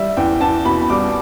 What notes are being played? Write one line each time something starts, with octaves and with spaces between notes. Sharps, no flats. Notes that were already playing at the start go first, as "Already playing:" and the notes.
Already playing: G3 E5
E2 G5
E2 A5
B2 B5
G3 D6